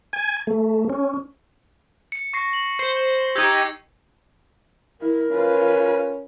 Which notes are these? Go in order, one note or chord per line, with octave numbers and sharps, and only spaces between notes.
G#5
A3
C#4
C#7
C#6 A#6 C7
F#7
C5
D#4 G4 E6 G#6
E4 A#4
C#4 F4 B4